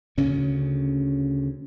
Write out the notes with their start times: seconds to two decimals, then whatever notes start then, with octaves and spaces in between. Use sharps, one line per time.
0.18 D2 C#3 C#4